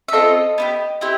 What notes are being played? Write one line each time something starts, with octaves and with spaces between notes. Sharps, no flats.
E5
C4 F4 A4 D#5
B3 E4 G4
C4 E4 G4